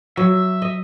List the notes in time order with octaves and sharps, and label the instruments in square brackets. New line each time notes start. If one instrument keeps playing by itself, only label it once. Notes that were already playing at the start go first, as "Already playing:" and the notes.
[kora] F#3 [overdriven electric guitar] E5
[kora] D#5